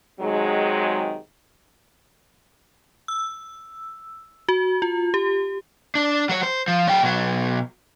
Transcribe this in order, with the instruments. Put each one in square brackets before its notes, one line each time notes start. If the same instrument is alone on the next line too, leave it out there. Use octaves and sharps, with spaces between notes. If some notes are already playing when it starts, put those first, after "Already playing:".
[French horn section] C3 D#3 F#3 G#3
[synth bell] E6
F#4
F4
G4
[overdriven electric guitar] D4
F#3 C#5
C5
F3
F#3 G5
B2 F#3